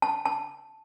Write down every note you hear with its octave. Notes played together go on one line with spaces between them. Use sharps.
A5
A5